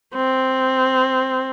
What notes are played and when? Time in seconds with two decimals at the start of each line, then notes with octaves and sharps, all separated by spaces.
0.15 C4